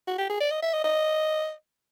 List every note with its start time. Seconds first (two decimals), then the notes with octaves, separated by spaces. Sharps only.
0.08 F#4
0.18 G4
0.30 G#4
0.40 D5
0.51 D#5
0.63 E5
0.73 D#5
0.84 D#5